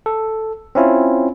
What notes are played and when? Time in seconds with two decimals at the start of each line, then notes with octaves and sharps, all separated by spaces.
0.06 A4
0.75 C4 C#4 E4 F4